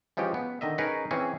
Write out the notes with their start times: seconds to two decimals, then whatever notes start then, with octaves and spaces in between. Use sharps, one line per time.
0.17 E3 F3 G#3 C#4 G4
0.34 B3
0.61 D3 D#3 D#5 E5
0.78 C#4 D#4 G#4 A#4 B4 C#5
1.11 E3 C4 C#4 G#4 E5